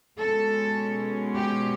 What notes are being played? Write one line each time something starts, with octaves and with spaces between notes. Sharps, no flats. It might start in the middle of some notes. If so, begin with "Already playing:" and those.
B2 G#3 C#4 A4
G4